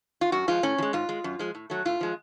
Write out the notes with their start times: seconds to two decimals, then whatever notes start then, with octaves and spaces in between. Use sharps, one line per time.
0.21 F4
0.32 F#2 F#4
0.48 F3 G#3 F4
0.63 A2 C#4
0.78 F3
0.82 G#3
0.93 G#2 F4
1.09 G#3
1.24 F#2
1.39 F3 G#3
1.55 A2
1.70 F#3 A3
1.85 A2 F4
2.01 F3 G#3